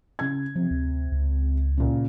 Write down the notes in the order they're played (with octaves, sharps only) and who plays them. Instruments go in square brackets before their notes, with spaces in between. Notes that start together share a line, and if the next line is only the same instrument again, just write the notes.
[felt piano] C#3 G#6
[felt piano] C3 [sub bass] F3
[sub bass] D2
C#2
[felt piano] A#2 C#3